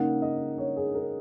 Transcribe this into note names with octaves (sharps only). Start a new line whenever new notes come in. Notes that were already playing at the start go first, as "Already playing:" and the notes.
Already playing: C#3 A#3 D#4 F#5
D#5
C#5
G#4
A#4